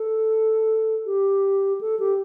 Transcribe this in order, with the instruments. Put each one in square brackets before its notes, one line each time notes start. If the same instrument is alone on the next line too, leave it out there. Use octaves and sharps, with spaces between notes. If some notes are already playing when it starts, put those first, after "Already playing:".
Already playing: [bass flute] A4
G4
A4
G4